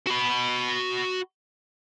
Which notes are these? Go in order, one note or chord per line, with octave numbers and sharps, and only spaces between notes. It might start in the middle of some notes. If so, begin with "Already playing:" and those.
F#4 B5